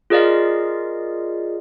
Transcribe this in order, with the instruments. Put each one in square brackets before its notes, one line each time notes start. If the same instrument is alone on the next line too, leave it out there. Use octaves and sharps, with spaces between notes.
[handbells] F4 G#4 A#4 D5 D#5 F5